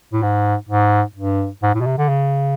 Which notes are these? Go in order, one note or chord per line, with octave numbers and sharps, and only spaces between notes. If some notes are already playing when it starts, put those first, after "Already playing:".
A2
G#2
G#2
G2
G#2
A2
B2
C3
D3
C#3